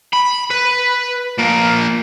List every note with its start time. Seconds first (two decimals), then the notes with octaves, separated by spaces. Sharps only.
0.13 B5
0.51 B4
1.38 F3 A#3